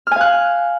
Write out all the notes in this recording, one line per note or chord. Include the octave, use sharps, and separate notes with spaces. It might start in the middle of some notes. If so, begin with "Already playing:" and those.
F5 G#5 F6 F#6